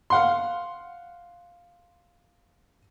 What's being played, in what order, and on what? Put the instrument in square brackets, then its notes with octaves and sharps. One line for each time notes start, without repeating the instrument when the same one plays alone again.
[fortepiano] F5 F#5 C6